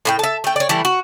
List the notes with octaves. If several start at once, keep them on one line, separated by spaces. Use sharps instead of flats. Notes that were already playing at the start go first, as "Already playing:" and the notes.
A2 E4 G5
E5 A5
A3 G5
C#5 D5
E3 G3 A3 E4
F#4